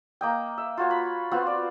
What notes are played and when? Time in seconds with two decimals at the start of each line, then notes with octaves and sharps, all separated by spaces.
0.21 A#3 D#5 G5
0.58 E5
0.77 F4 F#4 C#5
0.91 B5
1.31 B3 C4 F4 F#4
1.47 D5